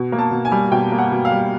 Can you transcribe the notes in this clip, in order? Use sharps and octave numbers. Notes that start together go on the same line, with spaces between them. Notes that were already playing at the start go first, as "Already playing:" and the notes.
Already playing: B2
A#3
A5
B2
G#5
G3
B2 G5
A#3
F#5
B2
F5
G3